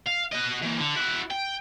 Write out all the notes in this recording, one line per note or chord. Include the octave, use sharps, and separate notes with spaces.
F5
F#4 D#5
E3 A#3
D3
E4 F#4
G5